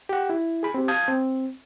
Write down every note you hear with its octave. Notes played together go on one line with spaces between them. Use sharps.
G4 F#5
E4
G#4 B5
C4 G4
F5 A5 D#6 G6 G#6
C4